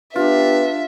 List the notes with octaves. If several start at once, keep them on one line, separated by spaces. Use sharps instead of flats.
B3 D4 F4 G4 B4 E5